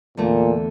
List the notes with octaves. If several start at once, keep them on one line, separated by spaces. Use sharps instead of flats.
E2 A#2 D3 A3